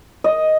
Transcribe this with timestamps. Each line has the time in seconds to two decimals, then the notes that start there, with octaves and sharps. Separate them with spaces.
0.24 D#5